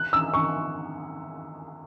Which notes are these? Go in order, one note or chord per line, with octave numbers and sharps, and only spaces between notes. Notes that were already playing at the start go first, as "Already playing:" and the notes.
Already playing: F#6
E6
C#6